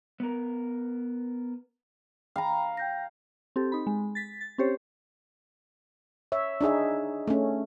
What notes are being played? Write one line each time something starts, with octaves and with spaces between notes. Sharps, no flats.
B3 A#4
F5 G5 A#5 B5
G5 G6 A#6
C4 G4 A4
D#4 B5
G#3
A6 B6
A6
C4 C#4 G4 C5 C#5
C#5 E5
D4 D#4 G#4 E5
A3 C#4